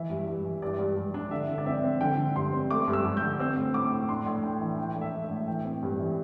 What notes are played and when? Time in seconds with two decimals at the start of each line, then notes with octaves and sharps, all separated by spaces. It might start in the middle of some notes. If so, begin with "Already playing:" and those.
Already playing: E3 E5
0.10 G2
0.28 G2
0.45 E3
0.62 G2 D5
0.79 G2
0.96 G2
1.14 D4
1.31 D3 E5
1.49 D3
1.58 D5
1.66 C4 E5
1.83 C4
2.01 D3 G5
2.17 D3
2.35 G2 C6
2.53 C4
2.70 A3 D6
2.88 G2
2.93 E6
3.04 G2
3.17 D3 G6
3.39 C4 E6
3.57 A2
3.74 A2 D6
3.92 A2
4.09 D4 C6
4.26 A2
4.43 D4 G5
4.61 E3
4.78 D4 G5
4.96 A3
5.01 E5
5.12 D4
5.25 E5
5.31 A2
5.47 E3 G5
5.64 C4
5.83 G2
5.99 E3